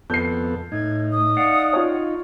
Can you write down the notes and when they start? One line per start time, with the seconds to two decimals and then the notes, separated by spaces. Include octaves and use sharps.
0.10 F2 B3 A4 G6 C7
0.72 A2 D#4 G#6
1.12 D#6
1.37 D5 F5 F#5
1.73 F4 C#5